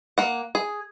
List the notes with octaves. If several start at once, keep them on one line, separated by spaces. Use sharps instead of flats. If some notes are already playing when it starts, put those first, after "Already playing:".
A#3 F#5
G#4